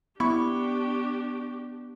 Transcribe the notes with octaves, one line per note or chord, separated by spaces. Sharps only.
B3 D4 E4 G4 C#6